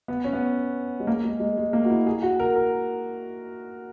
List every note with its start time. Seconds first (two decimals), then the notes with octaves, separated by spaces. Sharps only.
0.08 B3
0.24 C#4
0.33 B3
1.00 G#3
1.07 A#3
1.24 G#3
1.40 G#3
1.57 G#3
1.73 A#3
1.85 F#4
1.90 E4
2.07 G#4
2.23 F#4
2.40 A#4
2.56 A#4